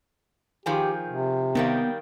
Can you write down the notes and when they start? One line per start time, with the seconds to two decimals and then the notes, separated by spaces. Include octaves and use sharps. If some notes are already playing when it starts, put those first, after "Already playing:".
0.66 D#3 F3 G4 G#4
1.09 C3
1.55 D#3 G3 A#3 B3